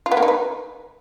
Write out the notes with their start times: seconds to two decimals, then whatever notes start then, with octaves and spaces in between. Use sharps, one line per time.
0.06 F4
0.11 B3
0.17 A#3
0.23 D#4
0.28 B4